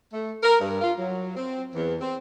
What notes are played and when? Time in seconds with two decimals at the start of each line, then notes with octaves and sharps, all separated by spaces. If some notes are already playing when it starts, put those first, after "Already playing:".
0.12 A3
0.43 A#4
0.60 G2
0.81 F4
0.98 F#3
1.36 C4
1.75 E2
2.01 C4